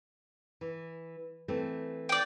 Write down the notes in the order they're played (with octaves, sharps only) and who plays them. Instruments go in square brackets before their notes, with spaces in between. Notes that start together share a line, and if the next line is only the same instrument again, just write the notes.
[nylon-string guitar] E3
E3 A3 C4
[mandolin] D5 G5